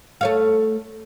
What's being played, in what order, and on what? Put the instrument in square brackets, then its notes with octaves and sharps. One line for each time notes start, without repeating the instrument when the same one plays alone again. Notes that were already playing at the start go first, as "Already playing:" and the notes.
[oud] A3 C#5 F5